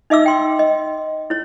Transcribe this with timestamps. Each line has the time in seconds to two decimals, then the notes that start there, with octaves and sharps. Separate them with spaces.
0.10 D#4 D#5 E5 D6 E6
0.26 G5 C6
0.59 D#5
1.30 E4 C#5